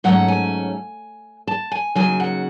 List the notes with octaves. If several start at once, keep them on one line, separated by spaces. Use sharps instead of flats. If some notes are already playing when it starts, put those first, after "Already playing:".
G#2 F#3 A3 C#4 F#5
G#5
A5
G#5
D#2 C#3 F#3 G#5
F#5